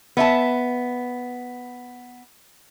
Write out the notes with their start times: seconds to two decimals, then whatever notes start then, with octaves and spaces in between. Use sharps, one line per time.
0.17 B3 E5 A5